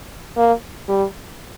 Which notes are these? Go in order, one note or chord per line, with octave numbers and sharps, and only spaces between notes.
A#3
G3